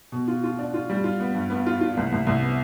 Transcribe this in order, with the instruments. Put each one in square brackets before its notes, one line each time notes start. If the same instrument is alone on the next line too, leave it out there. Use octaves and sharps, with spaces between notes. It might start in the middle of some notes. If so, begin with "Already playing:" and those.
[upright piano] B2
F4
F4
D4
F4
G3
F4
B3
G2
B3
F4
F4
C2
C2
C2
B3